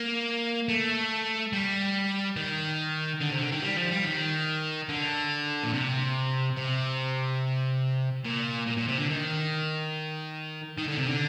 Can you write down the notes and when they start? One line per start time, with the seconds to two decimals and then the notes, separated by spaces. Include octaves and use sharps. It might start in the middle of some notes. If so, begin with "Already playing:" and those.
Already playing: A#3
0.69 A3
1.53 G3
2.36 D#3
3.21 D3
3.31 C3
3.42 D3
3.52 D#3
3.63 G3
3.77 F3
3.91 G3
4.05 D#3
4.89 D3
5.63 A#2
5.73 C3
6.57 C3
8.25 A#2
8.67 A#2
8.78 A#2
8.88 C3
8.99 D3
9.10 D#3
10.78 D#3
10.87 D3
10.97 C3
11.07 D3